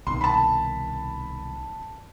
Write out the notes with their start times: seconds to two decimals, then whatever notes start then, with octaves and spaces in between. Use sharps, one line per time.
0.07 C2 B2 D#3 C6
0.21 A5 B5